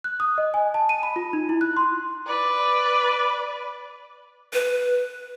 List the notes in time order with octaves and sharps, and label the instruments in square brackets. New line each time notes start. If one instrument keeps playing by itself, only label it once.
[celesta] F#6
D#6
D#5
G#5
A5
D#7
B5
F4
D#4
E4
F#6
C6
[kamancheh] B4 D5
[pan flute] B4